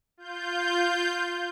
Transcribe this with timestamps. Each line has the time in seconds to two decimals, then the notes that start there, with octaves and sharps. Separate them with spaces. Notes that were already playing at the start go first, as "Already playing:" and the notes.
0.17 F4 G6